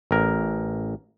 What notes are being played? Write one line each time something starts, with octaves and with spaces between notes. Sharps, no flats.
A1 A#4